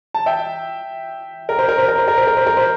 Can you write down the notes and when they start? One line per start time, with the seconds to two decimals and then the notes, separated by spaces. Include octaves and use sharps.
0.14 A5
0.26 E5 G5
1.49 A#4
1.59 C5
1.69 A#4
1.78 C5
1.88 A#4
1.98 C5
2.08 A#4
2.18 C5
2.27 A#4
2.37 C5
2.47 A#4
2.57 C5